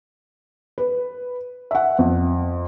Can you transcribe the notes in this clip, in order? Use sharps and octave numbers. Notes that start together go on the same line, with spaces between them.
B4
E5 F#5
F2